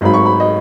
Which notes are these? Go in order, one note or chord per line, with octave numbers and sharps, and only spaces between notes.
G#1 G#2 F#3 B5
C#6
B5
D#5